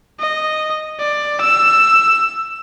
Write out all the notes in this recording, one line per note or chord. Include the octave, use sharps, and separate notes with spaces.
D#5
D5
E6